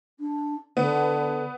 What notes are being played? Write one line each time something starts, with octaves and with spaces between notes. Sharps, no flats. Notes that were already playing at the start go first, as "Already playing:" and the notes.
D4
D3 B3